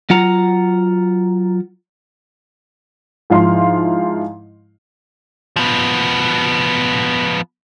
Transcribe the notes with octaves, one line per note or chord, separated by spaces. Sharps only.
F#3 F4 F#5 A#5
G#2 F3 E4 F5 C6
F3 B3